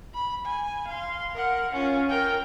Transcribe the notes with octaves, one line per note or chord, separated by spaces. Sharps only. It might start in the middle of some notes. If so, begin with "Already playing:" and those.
B5
G#5
F5 C6
A#4 F#5
C#4 F4
A#4 G5